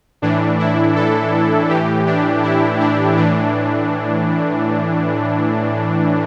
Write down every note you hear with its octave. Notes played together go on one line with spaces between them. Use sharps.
A2 E3 D4
E4
A4
A2 E3 G4
D4
E4
D4
A2 E3 D4